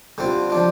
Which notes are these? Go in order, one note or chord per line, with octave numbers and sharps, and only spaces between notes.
D3 G3 C4 F4
F3 D4 F4